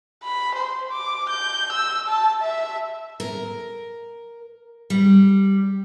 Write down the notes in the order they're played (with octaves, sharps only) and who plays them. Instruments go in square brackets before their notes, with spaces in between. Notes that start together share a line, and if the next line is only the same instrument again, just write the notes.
[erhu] B5
C5
D6
G6
E6
A5
E5
[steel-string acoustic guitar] A#4
G3